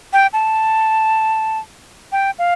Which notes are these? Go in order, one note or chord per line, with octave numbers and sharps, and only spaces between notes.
G5
A5
G5
F5